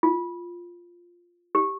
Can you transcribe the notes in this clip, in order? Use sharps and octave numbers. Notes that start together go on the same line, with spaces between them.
F4
G4